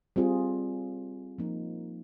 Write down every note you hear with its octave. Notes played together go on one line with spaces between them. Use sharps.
G3 C4 F4 G#4
F3 A#3 D#4